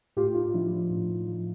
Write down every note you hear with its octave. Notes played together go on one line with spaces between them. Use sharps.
A2 F4 G4
A2 D#4 F4
F3 D4 E4
F3
A2
A2
F3